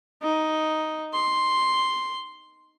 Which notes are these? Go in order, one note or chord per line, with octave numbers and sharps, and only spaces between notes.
D#4
C6